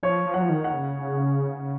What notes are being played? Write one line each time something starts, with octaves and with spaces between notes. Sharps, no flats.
F3 C#5
F3
F#3 F#5
F3
D#3
F#5
C#3